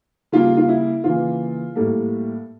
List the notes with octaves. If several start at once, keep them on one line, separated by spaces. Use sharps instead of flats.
C#3 G3 A#3 F4
F4
E4
C#3 E3 A#3 F4
A2 G3 A#3 A4